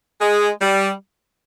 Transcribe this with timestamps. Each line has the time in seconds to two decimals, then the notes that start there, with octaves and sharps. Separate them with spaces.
0.20 G#3
0.61 G3